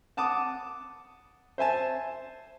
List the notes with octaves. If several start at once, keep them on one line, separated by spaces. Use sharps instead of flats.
F#5 A5 D6 D#6
C5 E5 G#5 A5